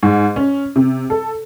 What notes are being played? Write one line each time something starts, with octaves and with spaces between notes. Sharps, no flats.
G#2
C#4
C3
A4